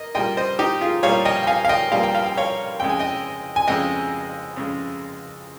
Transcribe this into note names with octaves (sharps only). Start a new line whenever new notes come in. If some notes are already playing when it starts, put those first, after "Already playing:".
Already playing: A#3 D#5
A#2 G3 A#3 D#5 G5
C5 D#5
D#4 G4
F4 G#4
A#2 G3 A#3 C#5 F5
D#5 G5
G5
F5 G#5
F5
D#5 G5
A#2 G3 A#3 F5
G5
F5
G5
C#5 F5
F2 C#3 G#3 G5
G#5
D#5 G5
G#5
F2 C#3 G#3 D#5 G5
F2 C#3 G#3